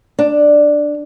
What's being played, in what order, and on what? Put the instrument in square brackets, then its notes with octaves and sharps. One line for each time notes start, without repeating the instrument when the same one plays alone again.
[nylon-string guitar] D4